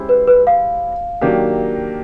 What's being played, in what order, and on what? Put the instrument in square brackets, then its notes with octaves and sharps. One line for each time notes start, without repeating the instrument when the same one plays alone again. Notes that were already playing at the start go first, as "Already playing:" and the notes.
Already playing: [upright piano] G#3 C#4 E4 G4 C5
[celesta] B4
B4
F5
[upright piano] D#3 F#3 A#3 D4 G4